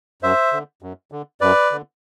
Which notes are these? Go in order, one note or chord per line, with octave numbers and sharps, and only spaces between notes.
F#2 C5 E5
D3
F#2
D3
F#2 B4 D5
D3